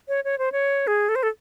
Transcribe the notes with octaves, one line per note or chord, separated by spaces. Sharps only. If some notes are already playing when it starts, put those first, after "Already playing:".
C#5
C#5
C5
C#5
G#4
A4
C5
A4